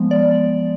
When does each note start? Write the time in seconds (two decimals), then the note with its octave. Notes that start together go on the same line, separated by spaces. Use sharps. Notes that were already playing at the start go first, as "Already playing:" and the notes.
Already playing: F3 G#3 B3
0.11 D5